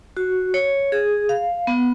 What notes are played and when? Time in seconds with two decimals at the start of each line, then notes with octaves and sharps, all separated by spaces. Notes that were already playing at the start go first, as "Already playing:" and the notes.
0.17 F#4
0.54 C#5
0.92 G#4
1.29 F5
1.67 B3